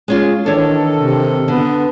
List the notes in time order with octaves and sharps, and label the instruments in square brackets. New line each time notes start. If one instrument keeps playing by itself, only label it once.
[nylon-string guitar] G#3 C#4 F4
[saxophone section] D#3 A4 [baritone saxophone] E3 [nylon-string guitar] D4 C#5
[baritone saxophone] C3
[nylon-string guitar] D3 [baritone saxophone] B3